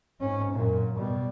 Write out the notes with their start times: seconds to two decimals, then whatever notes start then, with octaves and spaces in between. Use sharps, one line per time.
0.20 G#2 C#4
0.53 F#2 A#2
0.98 B2 G3